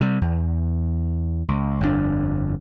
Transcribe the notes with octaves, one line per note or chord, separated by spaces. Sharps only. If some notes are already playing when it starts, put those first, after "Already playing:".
C3 G3
E2
C#2
G1 F2 C3 D4